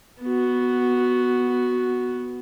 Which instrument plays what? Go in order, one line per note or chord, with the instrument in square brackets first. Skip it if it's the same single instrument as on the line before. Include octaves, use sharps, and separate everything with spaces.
[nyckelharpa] B3 F#4